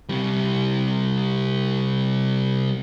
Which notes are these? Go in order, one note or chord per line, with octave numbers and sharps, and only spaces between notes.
C3 G3